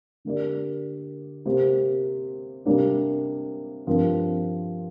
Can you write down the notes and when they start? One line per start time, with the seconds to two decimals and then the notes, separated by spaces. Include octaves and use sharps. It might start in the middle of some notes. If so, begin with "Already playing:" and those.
0.25 D3 A#3 G4 A#4 D5
1.46 C3 A#3 G4 C5
2.66 C3 G3 A#3 D4
3.87 G2 F3 C4 A#4